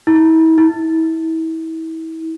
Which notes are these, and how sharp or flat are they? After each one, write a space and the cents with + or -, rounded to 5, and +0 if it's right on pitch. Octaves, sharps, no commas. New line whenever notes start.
E4 -40
E4 -35